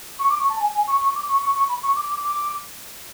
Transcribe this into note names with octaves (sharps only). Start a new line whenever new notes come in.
C#6
D6
C#6
A5
G#5
G#5
C#6
C#6
D6
C#6
C#6
C#6
B5
C#6
D6
D6
D6